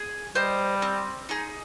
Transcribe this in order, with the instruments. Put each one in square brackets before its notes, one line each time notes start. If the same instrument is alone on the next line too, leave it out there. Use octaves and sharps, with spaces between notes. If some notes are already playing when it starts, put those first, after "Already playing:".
Already playing: [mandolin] G#4
[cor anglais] G3 [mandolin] C5 D#5
[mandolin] C4
D#4 G#4